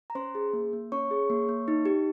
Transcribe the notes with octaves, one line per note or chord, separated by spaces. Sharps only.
A#5
C#4 C5 C6
G#4
A#3
A#3
C#4 C#5 C#6
G#4
A#3
A#3
D#4
G4